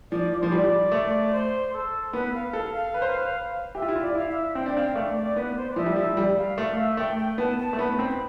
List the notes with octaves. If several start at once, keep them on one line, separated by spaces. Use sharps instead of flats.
F3 D5
D5
F3 C5
G3 D5
A3
C5
A4
B3 B4
F5
A4 F5
F5
B4
C5
B4
G4 E5
F4
E4
F4
D5
E4 F5
E5
C4 G5
D4
C4 F5
A3 D5
D5
B3 B4
C5
D5
F3 E5
G3
F3 E5
G3
F5
A3 F5
E5
A3 G5
G5
B3 A5
A5
A3
B3 B5
C4